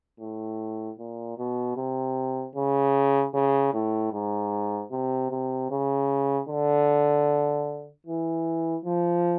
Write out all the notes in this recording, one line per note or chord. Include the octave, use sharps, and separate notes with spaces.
A2
A#2
B2
C3
C#3
C#3
A2
G#2
C3
C3
C#3
D3
E3
F3